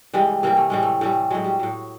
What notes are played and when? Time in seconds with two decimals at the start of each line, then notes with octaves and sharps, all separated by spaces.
0.14 C3 E3 G3 G#3
0.43 C3 E3 G3 A#3
0.57 A3
0.70 A2 E3 G3 G#3
0.83 A3
1.01 A2 E3 G3 A3
1.30 A2 F#3 G#3
1.44 G3
1.59 A2 F#3